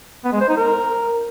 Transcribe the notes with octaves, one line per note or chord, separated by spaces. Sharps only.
B3
G#3
C5
D#4
A#4